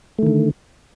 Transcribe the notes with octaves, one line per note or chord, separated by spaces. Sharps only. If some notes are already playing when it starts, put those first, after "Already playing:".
D3 D#3 A3